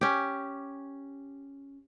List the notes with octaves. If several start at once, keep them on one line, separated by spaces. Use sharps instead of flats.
C#4 G4